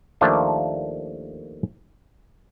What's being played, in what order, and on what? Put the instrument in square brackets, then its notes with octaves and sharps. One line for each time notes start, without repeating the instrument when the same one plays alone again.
[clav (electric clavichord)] D#2 F3 A3 A#3 D4 F4